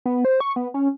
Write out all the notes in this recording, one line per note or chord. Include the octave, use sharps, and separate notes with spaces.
B3
C5
C#6
B3
C#4